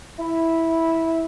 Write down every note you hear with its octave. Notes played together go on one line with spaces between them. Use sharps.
E4